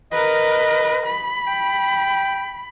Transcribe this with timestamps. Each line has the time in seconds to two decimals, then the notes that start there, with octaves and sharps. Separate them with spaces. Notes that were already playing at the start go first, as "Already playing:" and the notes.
0.12 A#4 B4 D#5
1.05 B5
1.47 G5